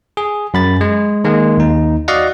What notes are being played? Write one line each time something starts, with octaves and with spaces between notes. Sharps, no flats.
G#4
F#2 B5 A6
G#3
D#3 G#3 A#3
D#2 D#4
F#4 D5 D#5 F5 F#5